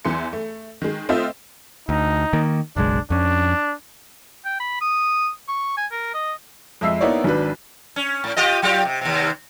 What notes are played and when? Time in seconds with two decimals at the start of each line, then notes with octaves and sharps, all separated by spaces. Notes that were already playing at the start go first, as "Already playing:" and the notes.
0.05 E2 E3 C6 C#7
0.33 A3
0.82 D#3 G#3
1.09 A3 C4 F4 C5 D#5 E5
1.89 D2 D#4
2.33 D#3 A#3
2.76 F#1 B1 G#3 D4
3.10 F2 C#4 D4
4.46 G5
4.60 B5
4.81 D#6
5.49 C#6
5.77 G#5
5.91 A#4
6.14 D#5
6.81 F2 G#3 E5 E6 C7
7.01 A#3 B3 D#4 E4 C#5 D5
7.24 G#1 F#3 D4 B4
7.96 C#4
8.24 A2
8.37 F4 G4 D#5
8.63 F#3 F4 G4
8.85 C3
9.01 D#2 C3